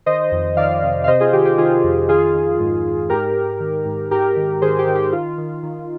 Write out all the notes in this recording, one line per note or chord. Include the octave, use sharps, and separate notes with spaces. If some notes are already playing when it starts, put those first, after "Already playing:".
D#3 C5 D#5
F2
D#3 D5 F5
C3
F5
C3 C5 D#5
F4 G#4
D#3 G4
G4
D#3 F4 G#4
F2
D#3 F4 G#4
D#3
G#2
G#2
G#2 G4 A#4
G#2
D#3
G#2
G#2 G4 A#4
D#3
D#3 G#4 C5
G4
D#3
G4
D#3 F4
D#3
D#3